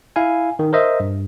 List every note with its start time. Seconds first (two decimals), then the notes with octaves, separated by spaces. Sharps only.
0.16 E4 F5 G#5
0.59 D#3
0.73 A#4 C5 D#5 E5
1.00 G2